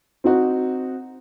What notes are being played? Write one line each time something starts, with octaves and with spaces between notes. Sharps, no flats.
C4 D#4 F#4